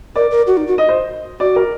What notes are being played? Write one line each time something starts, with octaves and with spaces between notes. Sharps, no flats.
A#4 D5
A#4
F#4
D#4
F#4
D#5
C5
F#4 D5
A#4